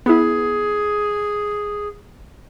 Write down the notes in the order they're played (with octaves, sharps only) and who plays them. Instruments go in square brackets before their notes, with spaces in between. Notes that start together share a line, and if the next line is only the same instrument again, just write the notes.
[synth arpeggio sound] B3 E4 [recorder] G#4